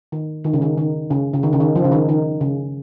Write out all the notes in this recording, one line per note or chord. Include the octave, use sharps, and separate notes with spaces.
D#3
D#3
C#3
D#3
D#3
C#3
C#3
D#3
C#3
D#3
F3
C#3
D#3
D#3
C#3